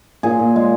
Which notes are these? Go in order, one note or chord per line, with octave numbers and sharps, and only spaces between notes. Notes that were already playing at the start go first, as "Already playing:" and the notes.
A#2 G#4
A#2
G#3